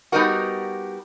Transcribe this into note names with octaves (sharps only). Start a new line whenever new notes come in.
G3 B3 D#4 F#4 A#4